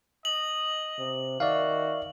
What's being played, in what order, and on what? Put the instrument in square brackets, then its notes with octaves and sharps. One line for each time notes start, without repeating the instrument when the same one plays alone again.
[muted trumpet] D#5 [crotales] F#7
[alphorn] C3
[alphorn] D#3 [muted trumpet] F#4 [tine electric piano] D5 E5 F5